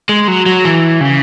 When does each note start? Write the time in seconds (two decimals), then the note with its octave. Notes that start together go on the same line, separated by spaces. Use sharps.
0.09 G#3
0.28 F#3
0.46 F#3
0.65 E3
1.01 C#3